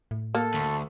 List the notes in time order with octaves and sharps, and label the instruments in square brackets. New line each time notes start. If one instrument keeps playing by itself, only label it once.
[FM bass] A2
[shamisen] A#3 [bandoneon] A4
[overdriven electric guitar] D2